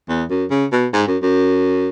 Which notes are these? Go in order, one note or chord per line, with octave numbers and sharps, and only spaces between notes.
E2
F#2
C#3
B2
G#2
F#2
F#2